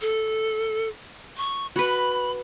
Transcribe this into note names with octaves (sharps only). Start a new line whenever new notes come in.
A4
C#6
F#4 B4 B5